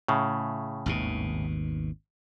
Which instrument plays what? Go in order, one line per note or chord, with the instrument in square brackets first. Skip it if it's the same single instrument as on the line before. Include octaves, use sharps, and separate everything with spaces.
[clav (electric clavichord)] A2 C#3
[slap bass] G#1 D#2 B2